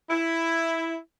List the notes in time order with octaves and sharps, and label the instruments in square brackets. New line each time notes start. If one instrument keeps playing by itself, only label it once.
[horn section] E4